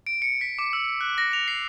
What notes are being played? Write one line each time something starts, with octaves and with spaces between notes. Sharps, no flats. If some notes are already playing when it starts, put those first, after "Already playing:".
D7
C#7
B6
D6
E6
F#6
A#6
F7
C7